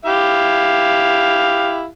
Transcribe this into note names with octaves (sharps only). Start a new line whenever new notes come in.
E4 G4 F5